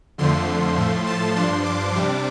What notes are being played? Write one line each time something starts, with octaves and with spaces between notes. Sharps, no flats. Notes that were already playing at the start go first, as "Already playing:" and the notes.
F2 D3 F3 A3 C6
A2 F3 A3
A5
G2 F3 D4 C6
D6
C3 G3 D4